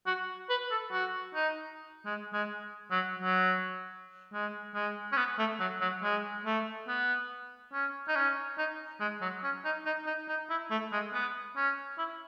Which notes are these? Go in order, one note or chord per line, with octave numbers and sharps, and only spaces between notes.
F#4
B4
A4
F#4
D#4
G#3
G#3
F#3
F#3
G#3
G#3
C#4
B3
A3
F#3
F#3
G#3
A3
B3
C#4
D#4
C#4
D#4
G#3
F#3
C#4
D#4
D#4
D#4
D#4
E4
A3
G#3
B3
C#4
E4